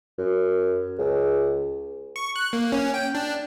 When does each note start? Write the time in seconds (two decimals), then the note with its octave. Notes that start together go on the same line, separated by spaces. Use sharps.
0.18 F#2
0.98 C#2
2.16 C#6
2.36 F#6
2.53 A#3
2.72 C#4
2.94 G5
3.15 D4